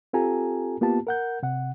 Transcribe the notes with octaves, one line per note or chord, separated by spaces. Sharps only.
C4 F4 G4 A4 G#5 A#5
A#3 B3 F4 G4 A5
A#4 F#5 G6
C3 F#5